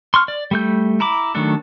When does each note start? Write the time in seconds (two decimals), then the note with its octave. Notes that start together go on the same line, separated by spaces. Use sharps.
0.14 C6 C#6 F6
0.28 D5
0.51 G3 A3 G6
1.00 E4 A#5 B5 D6
1.35 D#3 F#3 A3 D4 A4